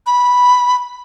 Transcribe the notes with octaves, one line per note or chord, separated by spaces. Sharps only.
B5